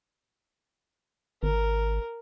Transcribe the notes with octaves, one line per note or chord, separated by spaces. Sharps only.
G#1 A#4